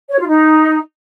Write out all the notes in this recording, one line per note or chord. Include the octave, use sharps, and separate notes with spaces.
C#5
F4
D#4